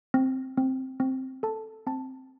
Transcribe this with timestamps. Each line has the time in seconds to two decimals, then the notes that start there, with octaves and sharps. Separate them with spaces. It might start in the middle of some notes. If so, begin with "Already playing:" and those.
0.14 C4
0.57 C4
1.00 C4
1.43 A4 A5
1.87 C4 A5